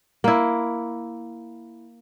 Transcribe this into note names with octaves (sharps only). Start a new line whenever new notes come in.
A#3 E4